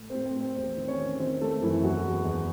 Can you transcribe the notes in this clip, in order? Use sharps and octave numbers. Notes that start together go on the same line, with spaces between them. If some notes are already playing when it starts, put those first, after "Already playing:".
Already playing: A2
C4 C5
A2
C4 C5
A2 C4 C5
E2 C4 C5
D#3
C#4 C#5
D#3
D#3 C4 C5
D#3 A3 A4
F#2 E3 E4
E2 F#3 F#4
E2
E2